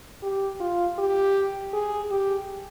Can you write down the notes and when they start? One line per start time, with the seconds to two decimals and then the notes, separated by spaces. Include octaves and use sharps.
0.23 G4
0.60 F4
0.98 G4
1.73 G#4
2.11 G4